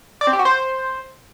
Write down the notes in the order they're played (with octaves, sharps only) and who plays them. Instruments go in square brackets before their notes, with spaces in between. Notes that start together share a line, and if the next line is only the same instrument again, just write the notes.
[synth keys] D5
C4
G4
F#4
C5